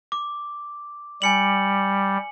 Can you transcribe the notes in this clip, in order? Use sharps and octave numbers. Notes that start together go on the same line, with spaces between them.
D6
G3 G#5 C#7 F#7